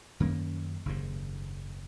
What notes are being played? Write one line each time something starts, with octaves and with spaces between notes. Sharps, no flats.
F#2 D#3 A#3 C#4
F#1 D#2 G#2